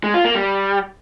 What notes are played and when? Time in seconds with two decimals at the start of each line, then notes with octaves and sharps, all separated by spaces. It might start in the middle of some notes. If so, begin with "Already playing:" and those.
0.04 G#3
0.14 F4
0.25 A#3
0.35 G3